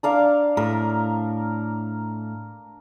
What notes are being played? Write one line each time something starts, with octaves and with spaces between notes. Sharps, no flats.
D4 A#4 F5
A2 A#4